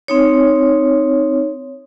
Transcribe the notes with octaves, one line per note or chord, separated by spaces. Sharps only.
C4 D#4 C#5